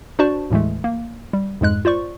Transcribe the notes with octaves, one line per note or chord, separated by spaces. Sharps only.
D4 F#4 C5 D5 A5 C#6
D#2 A2 E3 G#3 A3
A#3
G3
F2 G#2 G#3 F#6
F4 C5 D5 C#6